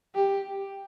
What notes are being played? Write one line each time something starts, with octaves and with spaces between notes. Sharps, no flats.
G4